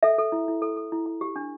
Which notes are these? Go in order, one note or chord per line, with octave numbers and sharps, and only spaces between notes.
A4 E5
A4
E4
E4
A4
A4
E4
E4
G4
D4